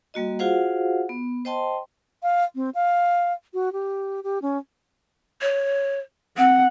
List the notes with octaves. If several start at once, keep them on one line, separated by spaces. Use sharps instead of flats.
G3 A#3 F#4 D#5
F4 F#4 G#4 C5 F5 F#5
B3
C5 D#5 G5 A5 C6
F5
C4
F5
F#4
G4
G4
C#4
C#5
C4 F#5